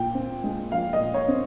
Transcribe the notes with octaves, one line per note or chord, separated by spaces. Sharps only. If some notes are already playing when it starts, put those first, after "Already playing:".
Already playing: A#2 G5
C4
G#3
F3 F5
D#5
A#2
C#5
C4